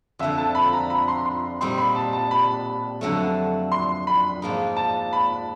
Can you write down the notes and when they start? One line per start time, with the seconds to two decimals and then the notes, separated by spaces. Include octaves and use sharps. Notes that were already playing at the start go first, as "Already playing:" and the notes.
0.19 F2 D3 F3 E5
0.38 A5
0.55 B5
0.73 A#5
0.90 B5
1.08 C6
1.26 C6
1.61 A#2 G3 C4 D#4 C6
1.78 B5
1.96 A5
2.13 A5
2.31 B5
3.01 F2 D3 F#3 A3
3.72 C6
4.07 B5
4.42 G#2 F3 A#3 D#4
4.77 A5
5.13 B5